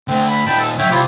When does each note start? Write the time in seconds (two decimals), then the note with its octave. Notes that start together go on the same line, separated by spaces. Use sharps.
0.08 D3 A3 C4
0.28 B5
0.46 A#2 D#4 G5 A5 B5
0.59 A4 E6
0.79 D3 F#3 C#5 E5 G5
0.91 C2 E4 F4 G4 C5